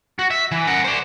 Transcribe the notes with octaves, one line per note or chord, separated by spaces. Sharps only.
F#4
E5
E3
A#4 F#5
C5 D5